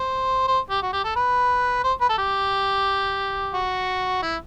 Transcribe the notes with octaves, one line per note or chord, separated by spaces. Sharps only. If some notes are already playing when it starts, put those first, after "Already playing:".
Already playing: C5
C5
G4
F#4
G4
A4
B4
C5
B4
A4
G4
F#4
E4